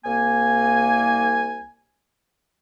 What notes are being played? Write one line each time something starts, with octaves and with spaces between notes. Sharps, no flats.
C2 A#3 G#5